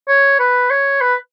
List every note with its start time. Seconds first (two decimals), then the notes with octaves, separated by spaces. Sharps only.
0.08 C#5
0.39 B4
0.70 C#5
1.01 B4